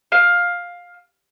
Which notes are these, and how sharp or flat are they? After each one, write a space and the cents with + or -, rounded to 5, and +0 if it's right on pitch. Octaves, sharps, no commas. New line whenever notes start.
F5 +10